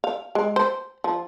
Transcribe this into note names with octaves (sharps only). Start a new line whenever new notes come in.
F5
G#3
C5
F3